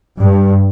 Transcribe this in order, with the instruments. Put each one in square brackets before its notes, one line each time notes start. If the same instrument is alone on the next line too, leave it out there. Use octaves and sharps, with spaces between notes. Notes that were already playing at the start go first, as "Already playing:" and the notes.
[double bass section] G2